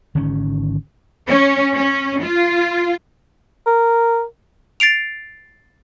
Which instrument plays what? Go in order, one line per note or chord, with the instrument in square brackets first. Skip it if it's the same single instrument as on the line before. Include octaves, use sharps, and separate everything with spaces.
[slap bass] G#1 D3 D#3 C#4
[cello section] C#4
C#4
F4
[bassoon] A#4
[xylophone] A6 C7 D7 F7